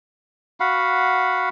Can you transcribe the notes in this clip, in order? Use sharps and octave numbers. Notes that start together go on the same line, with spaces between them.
F#4 F5 F#5 B5